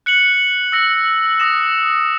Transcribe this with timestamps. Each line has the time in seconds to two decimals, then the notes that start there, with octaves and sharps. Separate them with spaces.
0.06 F#6 C#7 F#7
0.72 E6 A#6 C#7 F#7
1.40 D#6 A#6 E7